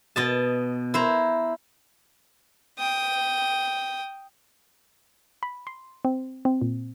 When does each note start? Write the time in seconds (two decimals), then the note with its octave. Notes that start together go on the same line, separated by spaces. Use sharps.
0.16 B2 D#5 A5
0.94 E4 C5 A#5
2.79 G5 D#6
5.43 B5
5.67 C6
6.05 C4
6.45 C4
6.61 A#2